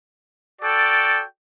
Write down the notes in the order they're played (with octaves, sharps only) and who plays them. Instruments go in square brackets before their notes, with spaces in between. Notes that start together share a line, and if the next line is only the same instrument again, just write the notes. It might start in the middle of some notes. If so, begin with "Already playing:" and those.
[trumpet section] F#4 A4 D5 G5